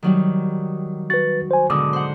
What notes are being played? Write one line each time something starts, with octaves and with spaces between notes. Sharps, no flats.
D#3 F#3 G3
F#4 B4 A6
C5 G#5
G#2 B2 D3 D6 D#6
C5 F#5